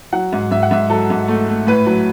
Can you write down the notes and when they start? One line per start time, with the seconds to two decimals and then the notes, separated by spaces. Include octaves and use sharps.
0.13 F#3 F#5
0.33 G#2
0.51 G#2 E5
0.63 F#5
0.71 G#2 E5
0.90 F#3 A4
1.10 G#2
1.28 A3
1.49 A3
1.67 A2 B4
1.86 F#3